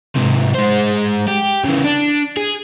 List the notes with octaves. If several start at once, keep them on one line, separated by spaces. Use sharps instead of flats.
G#2 C3
G#3 C5
G4
C#3 E3
D4
G#4